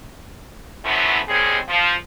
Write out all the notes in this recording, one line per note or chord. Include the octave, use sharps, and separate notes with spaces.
F3 F#3 A3 B3 C#4 E4
D#2 D#3 G3 C4 G#4 C#5
F3